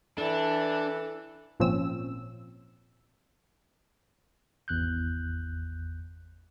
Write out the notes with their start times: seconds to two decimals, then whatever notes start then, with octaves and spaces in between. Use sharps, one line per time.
0.18 E3 D4 A4
1.60 G#1 A#2 F3 C4 C#4 E6
4.68 G#1 E2 F#6 G6